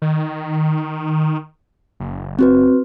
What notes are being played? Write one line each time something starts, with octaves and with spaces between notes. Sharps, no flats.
D#3
F#1
C4 F#4 B4